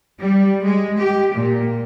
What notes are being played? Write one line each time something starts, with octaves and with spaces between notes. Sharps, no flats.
G3
G#3
G4
A#2